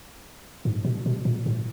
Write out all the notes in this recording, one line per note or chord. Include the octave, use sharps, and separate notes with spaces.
G#2
B2
B2
A#2
A2